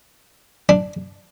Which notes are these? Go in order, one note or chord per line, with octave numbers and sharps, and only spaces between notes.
D4